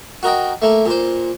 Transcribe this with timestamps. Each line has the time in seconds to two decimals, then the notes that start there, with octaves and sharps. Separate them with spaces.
0.23 F#4 A#4 D#5 G5
0.62 A3 A#3
0.86 A#2 C5